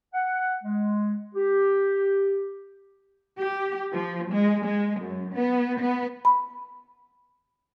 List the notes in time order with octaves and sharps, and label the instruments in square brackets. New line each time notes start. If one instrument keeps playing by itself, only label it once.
[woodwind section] F#5
G#3
G4
[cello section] G4
F3
G#3
G#3
F#2
B3
B3
[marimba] B5